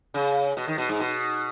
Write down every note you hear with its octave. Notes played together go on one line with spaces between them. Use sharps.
C#3
B2
D#3
B2
G#2
B2